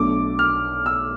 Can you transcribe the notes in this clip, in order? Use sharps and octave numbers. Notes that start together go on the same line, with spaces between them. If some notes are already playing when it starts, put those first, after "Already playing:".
Already playing: B1 B2 A3 D4 D6
F6
E6